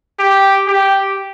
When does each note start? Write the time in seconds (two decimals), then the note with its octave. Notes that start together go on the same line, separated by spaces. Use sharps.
0.20 G4
0.67 G4